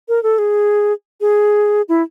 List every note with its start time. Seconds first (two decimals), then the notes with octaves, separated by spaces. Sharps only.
0.09 A#4
0.23 A4
0.38 G#4
1.21 G#4
1.89 E4